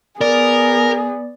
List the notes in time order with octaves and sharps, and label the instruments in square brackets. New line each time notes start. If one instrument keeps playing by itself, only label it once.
[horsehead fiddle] B3 [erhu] G#4 [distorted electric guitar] A#4 [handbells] D5